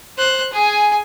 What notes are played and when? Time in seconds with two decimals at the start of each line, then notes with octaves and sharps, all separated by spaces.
0.18 C5 F#6
0.53 G#4 G#5